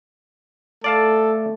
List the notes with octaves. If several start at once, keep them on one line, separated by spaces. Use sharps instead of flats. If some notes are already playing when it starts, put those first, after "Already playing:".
A3 A4 D5 F5 A5